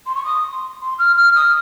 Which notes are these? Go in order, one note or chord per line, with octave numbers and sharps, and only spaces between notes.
C6
C#6
D#6
C6
C6
F6
F6
D#6